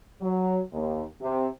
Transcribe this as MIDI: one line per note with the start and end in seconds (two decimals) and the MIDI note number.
0.22 0.60 54
0.73 1.04 39
1.21 1.47 48